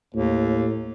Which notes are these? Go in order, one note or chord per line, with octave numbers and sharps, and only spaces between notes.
D#2 A2